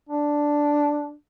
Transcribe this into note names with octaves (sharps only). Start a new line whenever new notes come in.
D4